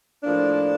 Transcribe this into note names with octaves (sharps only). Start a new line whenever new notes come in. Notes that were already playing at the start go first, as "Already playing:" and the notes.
A2 F3 A#3 D4